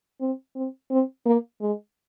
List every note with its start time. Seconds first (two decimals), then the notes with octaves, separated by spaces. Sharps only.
0.21 C4
0.56 C4
0.91 C4
1.26 A#3
1.61 G#3